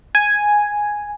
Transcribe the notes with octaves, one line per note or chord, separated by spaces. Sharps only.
G#5